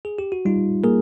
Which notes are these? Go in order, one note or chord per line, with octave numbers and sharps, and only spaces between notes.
G#4
G4
F#4
G3 D#4 F4
A#3 G#4 A#4